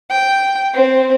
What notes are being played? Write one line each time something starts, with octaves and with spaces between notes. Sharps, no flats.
G5
C4